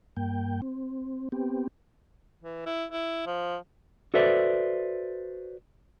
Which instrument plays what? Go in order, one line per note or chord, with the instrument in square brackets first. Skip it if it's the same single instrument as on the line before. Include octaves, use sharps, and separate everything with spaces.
[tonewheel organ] G2 A#3 G5
C4
B3 C4 G4
[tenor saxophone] E3
E4
E4
F3
[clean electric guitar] F#4 A4 B4 C5 D5 E5